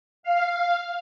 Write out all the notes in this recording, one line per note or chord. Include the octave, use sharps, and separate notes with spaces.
F5